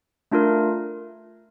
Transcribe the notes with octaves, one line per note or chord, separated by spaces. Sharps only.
A3 D4 F4 A#4